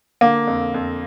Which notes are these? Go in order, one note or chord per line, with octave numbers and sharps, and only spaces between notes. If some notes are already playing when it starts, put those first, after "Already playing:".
D3 A#3
F2
F2